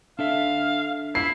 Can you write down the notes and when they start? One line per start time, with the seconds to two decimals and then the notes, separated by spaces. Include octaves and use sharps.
0.19 D4 A4 E5 F5
1.15 E4 C7